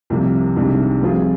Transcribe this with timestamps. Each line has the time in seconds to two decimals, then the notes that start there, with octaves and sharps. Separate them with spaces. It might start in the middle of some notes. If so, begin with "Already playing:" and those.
0.10 C2 C3 F3 A#3
0.56 C2 C3 D#3 G#3 D4
1.01 G2 F3 C4 F4 G#4